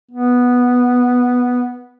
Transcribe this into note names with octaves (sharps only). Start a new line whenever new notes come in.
B3